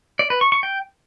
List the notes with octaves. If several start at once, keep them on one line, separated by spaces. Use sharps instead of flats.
D5
B4
C#6
C#6
G5